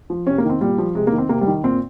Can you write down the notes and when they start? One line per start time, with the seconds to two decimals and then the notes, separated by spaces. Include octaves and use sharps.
0.10 F3
0.27 C3 C#4
0.38 A#3
0.44 D#3
0.50 C4
0.61 A#2 G3
0.78 F3
0.95 C3 G#3
1.07 A#3
1.12 D#3
1.18 C4
1.29 C3 A#3
1.41 G3
1.47 D#3
1.64 A#2 C4